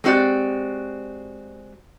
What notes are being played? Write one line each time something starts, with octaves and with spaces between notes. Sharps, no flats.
G#3 C4 F#4 G4 D5